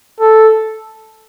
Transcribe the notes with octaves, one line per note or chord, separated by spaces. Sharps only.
A4